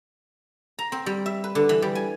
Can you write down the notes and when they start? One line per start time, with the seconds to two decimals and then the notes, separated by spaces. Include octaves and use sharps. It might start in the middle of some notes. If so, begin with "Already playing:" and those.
0.79 A#5
0.92 C4
1.06 G3
1.26 E5
1.44 B4
1.55 D3
1.69 E3
1.82 G3
1.95 G#5